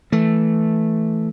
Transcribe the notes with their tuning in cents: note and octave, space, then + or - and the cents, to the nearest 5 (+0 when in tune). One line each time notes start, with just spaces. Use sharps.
E3 +0 A3 +0